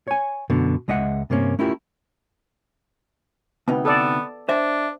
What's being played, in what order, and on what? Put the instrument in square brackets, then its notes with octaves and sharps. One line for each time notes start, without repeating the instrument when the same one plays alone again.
[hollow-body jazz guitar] C#5 G#5
F#2 B2 D3
C#2 G#3 D#5 E5 F#5
G2 C3 A#3 C#4
A3 C#4 E4 F4 G4 A#4
[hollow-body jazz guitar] D2 C3 D#4 [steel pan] B3
[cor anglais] B3 [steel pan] A4 D5
[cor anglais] D4 [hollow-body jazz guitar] C5 E5